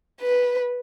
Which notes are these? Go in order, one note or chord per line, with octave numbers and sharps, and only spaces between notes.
B4